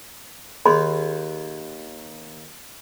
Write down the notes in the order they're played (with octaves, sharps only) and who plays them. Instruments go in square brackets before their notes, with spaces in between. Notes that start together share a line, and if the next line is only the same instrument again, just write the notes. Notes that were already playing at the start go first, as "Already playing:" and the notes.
[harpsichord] D#2 [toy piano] G#4 B5 C6